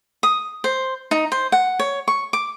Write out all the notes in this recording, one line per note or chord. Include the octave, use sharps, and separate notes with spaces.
D#6
C5
D#4
C5
F#5
C#5
C#6
D6